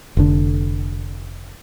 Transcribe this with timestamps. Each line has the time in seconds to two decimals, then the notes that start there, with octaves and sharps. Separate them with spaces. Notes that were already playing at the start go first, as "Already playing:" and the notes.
0.17 F1 D3